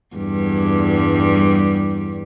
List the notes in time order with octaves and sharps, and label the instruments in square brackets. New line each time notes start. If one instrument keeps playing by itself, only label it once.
[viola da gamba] E2 G2 G3